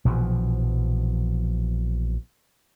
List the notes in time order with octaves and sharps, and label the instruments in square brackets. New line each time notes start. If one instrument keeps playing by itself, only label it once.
[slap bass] A#1 B2 E3 F3